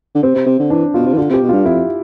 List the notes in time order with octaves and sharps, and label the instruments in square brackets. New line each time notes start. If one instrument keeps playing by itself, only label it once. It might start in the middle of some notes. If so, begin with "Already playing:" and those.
[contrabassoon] D3
[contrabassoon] C3 [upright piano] C4
[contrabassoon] C3
C3
D3
[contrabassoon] E3 [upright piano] D4
[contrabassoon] B2 [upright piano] F4
[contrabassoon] C3
E3
[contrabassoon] D3 [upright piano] F4
[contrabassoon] C3 [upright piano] G4
[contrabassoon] B2
[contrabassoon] G2 [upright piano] F4
[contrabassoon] F2 [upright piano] E4